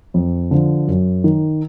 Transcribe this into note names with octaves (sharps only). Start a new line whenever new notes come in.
F2
D3 F3
F#2
D#3